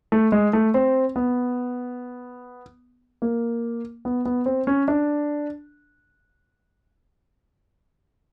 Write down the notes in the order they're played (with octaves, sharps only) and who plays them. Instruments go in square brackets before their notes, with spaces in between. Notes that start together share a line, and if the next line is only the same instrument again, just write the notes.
[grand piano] A3
G#3
A3
C4
B3
A#3
B3
B3
C4
C#4
D4